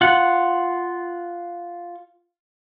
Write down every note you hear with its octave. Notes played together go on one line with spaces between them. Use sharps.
F4 F#5